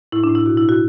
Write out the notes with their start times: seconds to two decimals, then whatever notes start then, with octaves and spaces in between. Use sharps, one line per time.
0.12 A2 E4
0.24 D4
0.29 A2
0.35 E4
0.46 B2 F#4
0.57 E4
0.63 B2
0.69 F#4